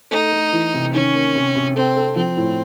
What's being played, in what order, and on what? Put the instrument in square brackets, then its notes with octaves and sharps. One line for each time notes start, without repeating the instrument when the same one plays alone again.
[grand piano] A3 [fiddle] D#4
[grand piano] A3
E3
C3
[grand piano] D#3 [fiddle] C#4
[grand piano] A#3
C3
C3
[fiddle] C4 [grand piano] A4
[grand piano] A4
[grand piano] F3 [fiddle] C4
[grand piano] A2